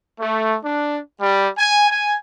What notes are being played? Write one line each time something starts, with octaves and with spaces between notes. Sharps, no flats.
A3
D4
G3
G#5
G#5